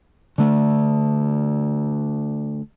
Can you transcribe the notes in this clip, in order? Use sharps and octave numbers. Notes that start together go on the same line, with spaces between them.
D3 A3